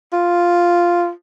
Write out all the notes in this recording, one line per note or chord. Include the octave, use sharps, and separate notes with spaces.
F4